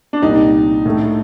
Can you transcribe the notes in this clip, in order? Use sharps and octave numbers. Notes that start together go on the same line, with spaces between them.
D4
C2 A#2 G3 D#4
A2 A3 D4 A4